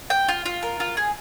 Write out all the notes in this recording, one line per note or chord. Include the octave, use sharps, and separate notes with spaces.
G5
F4
F4
A#4
F4
G#4